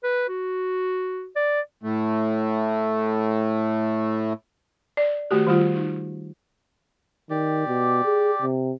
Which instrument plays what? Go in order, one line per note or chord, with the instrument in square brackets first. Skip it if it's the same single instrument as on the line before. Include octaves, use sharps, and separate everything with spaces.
[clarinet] B4
F#4
D5
[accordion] A2 A3
[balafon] D5
D#3 A3 F#4 G4
D#3 G3 F4
D#4
[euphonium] D#3 [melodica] G4 D5
[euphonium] B2
G#4
C3